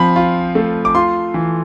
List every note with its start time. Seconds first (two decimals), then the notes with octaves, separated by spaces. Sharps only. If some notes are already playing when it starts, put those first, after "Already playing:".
Already playing: F3 C4 B5
0.16 F4
0.55 A3
0.85 D6
0.95 F4 C6
1.34 E3